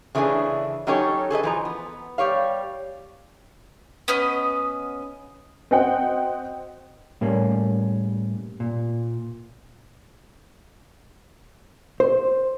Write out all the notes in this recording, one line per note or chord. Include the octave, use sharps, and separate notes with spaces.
C#3 E3 A3 B3 D4 G#4
F#3 C#4 D#4 G4 A4 C#5
G#4 A4 B4 D#5
E3 F3 A#5
B3
G3 G4 C#5 F5
B3 C#4 D#5
C4 F#4 C5 D#5 F#5 G5
A2 G3 A#3 C#4
A#2
C5